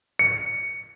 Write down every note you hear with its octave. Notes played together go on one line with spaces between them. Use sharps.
C#7